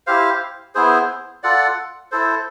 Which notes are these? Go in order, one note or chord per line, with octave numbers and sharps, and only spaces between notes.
E4 G4 C5 F5
B3 E4 G#4 C5
F4 A4 D5 F#5
E4 A4 C5